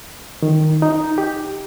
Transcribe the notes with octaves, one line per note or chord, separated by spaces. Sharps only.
D#3
D#4
G4